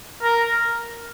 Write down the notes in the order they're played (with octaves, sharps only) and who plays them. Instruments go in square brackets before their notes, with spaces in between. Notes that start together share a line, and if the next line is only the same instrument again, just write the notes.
[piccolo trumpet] A#4